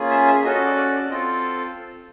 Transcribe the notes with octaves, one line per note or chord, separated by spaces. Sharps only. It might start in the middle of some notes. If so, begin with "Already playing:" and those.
Already playing: A#3 C#4 F4 G#4
E5
E5
C#4 F#4 A4 D#5
D#5
D5
D5
D5
C4 F4 A4 D#5